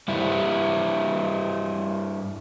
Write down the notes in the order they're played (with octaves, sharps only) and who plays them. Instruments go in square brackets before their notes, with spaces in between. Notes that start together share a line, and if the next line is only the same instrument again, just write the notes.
[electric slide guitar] G2 G3 E4